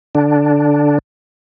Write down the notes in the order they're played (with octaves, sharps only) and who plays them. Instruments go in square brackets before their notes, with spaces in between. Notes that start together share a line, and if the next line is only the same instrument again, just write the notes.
[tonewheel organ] D3 D4